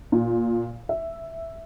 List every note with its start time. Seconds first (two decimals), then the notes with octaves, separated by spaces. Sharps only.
0.12 A#2
0.89 E5